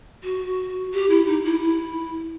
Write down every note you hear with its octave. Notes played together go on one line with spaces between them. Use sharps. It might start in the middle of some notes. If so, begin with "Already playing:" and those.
F#4
G4
E4
D#4
E4
E4